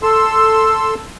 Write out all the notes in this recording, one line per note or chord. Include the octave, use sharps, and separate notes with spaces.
A4 C6 E6